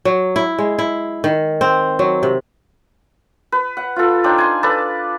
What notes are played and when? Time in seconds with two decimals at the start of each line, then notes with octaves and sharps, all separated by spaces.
0.05 F#3
0.36 E4
0.59 G#3
0.79 E4
1.24 D#3
1.61 C4
1.99 F#3
2.23 C3
3.52 B4
3.77 F#5
3.96 F4 A4
4.24 D4 D#4 C5 G5
4.38 G#5 C6
4.63 A4 B4 D5 A5